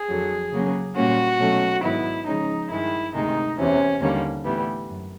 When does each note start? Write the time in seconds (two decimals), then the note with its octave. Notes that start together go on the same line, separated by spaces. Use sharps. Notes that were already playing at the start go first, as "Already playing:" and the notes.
Already playing: G#4
0.08 F2 D3 F#3
0.52 C#3 F#3 A#3 C#4
0.96 A#2 G3 A#3 C#4 F#4
1.39 B2 F#3 A3 C#4
1.83 G#2 D#3 F#3 B3 E4
2.27 C#3 F3 G#3 C#4 D#4
2.70 G2 D#3 G#3 E4
3.14 D2 C3 D#3 G#3 D#4
3.57 E2 C3 E3 C#4
4.01 D#2 D3 G3 A#3 C#4
4.45 A2 E3 G3 B3
4.88 F#2